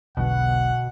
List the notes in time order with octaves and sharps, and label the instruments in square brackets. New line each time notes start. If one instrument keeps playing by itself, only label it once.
[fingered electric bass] E1 B1 D3 [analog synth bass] B2 [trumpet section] F#5